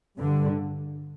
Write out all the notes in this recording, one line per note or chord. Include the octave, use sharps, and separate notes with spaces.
G2 D3